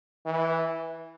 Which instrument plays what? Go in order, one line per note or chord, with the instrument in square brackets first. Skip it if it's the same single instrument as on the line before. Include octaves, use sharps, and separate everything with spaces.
[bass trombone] E3